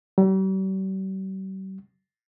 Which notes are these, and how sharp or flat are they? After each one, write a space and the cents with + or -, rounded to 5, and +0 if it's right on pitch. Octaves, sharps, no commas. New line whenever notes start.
G3 -45